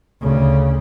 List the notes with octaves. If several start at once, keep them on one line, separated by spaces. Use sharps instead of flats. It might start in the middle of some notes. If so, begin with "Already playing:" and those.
D2 C#3